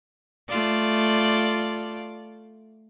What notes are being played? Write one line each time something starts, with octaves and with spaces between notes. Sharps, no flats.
A3 F4 D5